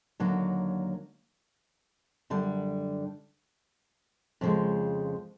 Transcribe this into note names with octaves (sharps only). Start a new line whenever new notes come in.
D#2 D3 F#3 A#3
F#2 D3 G3
F2 C#3 F3 G#3